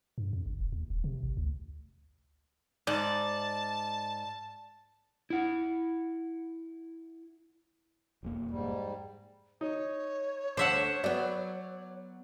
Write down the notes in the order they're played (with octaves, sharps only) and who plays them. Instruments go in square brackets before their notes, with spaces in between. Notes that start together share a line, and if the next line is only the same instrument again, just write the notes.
[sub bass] G2
F2
G1
E1
D#2
D#1
C3
G#1
D2
[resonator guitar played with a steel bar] G#2 [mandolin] D5 [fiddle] A5
[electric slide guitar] E4 F#5
[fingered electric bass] E1 F2 A#3
[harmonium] G#2 G3
[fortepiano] D#4 [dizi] C#5
[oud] D2 D4 [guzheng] C5 E5 F#5
[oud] F#3 B3 [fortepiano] D5